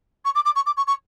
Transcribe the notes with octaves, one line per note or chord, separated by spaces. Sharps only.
C#6
D6
D6
C#6
D6
C#6
C#6